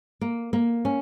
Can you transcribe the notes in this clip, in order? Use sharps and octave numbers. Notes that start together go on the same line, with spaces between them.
A#3
A#3
C#4